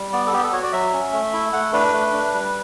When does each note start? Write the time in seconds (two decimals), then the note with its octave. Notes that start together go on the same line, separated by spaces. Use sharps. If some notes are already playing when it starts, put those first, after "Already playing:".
Already playing: G3
0.13 B3 D5
0.27 A4
0.32 B3 G4
0.43 A4
0.53 F#4 C#5
0.63 D5
0.72 F#3 E5
0.93 C#4
1.13 A3
1.33 E4
1.53 A3 F#5
1.73 D4 B4
1.93 A3
2.13 D4
2.33 G3